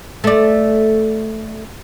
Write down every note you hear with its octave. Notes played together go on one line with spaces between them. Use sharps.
A3 D5